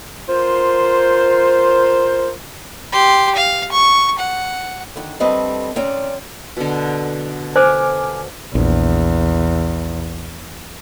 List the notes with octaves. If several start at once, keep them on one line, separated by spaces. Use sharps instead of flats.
F4 A#4 C5
G4 C6
F5
C#6
F#5
D3 D#3
D3 G3 A3 C4 B4 D#5
D2 C4 C#4 D5
B2 D3
C5 G#5 D6 F6
A#1 E2